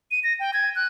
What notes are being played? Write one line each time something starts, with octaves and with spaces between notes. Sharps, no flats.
D#7
A#6
G5
G#6
F#6